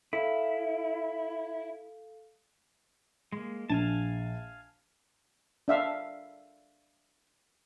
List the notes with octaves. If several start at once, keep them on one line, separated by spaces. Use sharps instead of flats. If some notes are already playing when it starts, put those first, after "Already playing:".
E4 A4 F5
G#3 A#3
A#1 F5 G#5 A5
D4 E5 F5